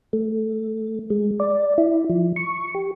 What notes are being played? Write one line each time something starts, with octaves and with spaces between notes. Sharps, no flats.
A3
G#3
D5
E4
F3
C#6
G4